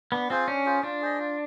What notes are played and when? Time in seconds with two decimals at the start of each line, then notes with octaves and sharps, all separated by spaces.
0.12 B3 D4
0.30 C4 F4 G#4 C5
0.47 C#4 D4
0.65 F4 G#4 C5
0.83 D4 F4
1.01 G#4 C5 D#5
1.19 F4